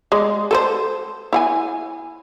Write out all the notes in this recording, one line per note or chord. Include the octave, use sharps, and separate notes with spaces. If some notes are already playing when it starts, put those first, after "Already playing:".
G#3 D5
A4 B4 C5
E4 F#5 G#5